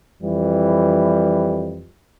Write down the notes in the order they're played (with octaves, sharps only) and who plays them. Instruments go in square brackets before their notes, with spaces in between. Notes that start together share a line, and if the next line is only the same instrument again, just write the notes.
[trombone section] F2 E3 G3